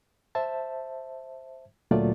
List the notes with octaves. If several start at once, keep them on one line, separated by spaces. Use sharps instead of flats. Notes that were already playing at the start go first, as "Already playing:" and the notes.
C5 E5 A5
D2 A#2 F#3 A3 F4 D5